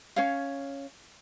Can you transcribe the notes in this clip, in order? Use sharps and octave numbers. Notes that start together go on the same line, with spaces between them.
C#4 C#5 F5